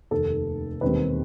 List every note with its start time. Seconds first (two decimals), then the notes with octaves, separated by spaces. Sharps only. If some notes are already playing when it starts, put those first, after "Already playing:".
0.11 F1 D#2 D#3 A4
0.81 E1 D#2 D#3 G3 C4 B4